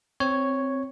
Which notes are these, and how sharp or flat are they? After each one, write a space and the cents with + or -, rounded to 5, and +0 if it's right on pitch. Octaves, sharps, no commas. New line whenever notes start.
C4 +0 C#5 +0